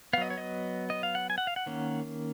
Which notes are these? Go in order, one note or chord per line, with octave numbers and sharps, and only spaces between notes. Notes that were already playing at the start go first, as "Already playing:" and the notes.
F#3 B3 D#5 F5
C#5
D#5
D#5
F5
F#5
G#5
F#5
F5
F#5
D#3 A#3 C#4